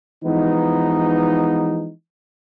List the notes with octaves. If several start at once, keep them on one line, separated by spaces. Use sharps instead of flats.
E3 F3 G#3 B3 D#4